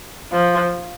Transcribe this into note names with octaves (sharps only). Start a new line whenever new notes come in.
F3